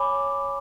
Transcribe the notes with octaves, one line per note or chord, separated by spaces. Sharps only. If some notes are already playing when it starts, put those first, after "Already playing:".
Already playing: C#5 G#5 B5 D6